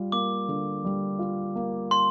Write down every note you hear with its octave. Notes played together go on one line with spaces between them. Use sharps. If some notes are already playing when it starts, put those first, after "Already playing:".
Already playing: G3 F4
A#3 D6
D3
G3
F4
A#3
C6